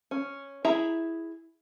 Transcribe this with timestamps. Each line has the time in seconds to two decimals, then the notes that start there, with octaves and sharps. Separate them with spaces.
0.11 C#4
0.65 E4 G#4 E5 A#5